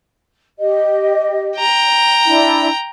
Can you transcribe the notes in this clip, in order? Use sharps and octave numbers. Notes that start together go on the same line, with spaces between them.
G4 D#5
G5 A#5
D4 E4